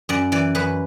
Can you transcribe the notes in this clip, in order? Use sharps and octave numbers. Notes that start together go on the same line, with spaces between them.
F#2 D5
E3 D5
F#2 B4